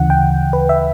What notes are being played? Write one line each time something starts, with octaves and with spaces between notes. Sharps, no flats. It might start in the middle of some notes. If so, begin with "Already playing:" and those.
Already playing: D2 C#3 E3 F#5
G5
B4
E5